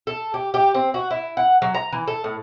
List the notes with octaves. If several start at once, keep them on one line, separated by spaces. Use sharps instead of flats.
A4
G4
G4
C4
F#4
E4
F#5
F#3
A#5
E3
A4
A2